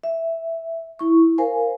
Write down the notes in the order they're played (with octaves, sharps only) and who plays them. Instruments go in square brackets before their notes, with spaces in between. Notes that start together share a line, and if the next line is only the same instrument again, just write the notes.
[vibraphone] E5
E4 C#6
A#4 C5 F5 G#5